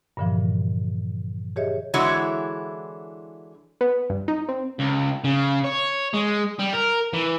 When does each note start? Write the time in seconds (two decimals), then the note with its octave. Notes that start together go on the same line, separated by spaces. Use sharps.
0.17 G2 A#2 D3 E3 F3
1.56 G4 G#4 C#5 D#5 E5
1.94 D3 E3 G#3 E4 F#4 C#5
3.81 B3
4.10 G2
4.28 D#4
4.49 C4
4.80 C#2
5.24 C#3
5.65 C#5
6.14 G#3
6.59 G3
6.73 A#4
7.14 E3